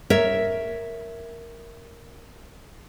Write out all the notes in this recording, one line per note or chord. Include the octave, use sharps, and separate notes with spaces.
A#4 C#5 E5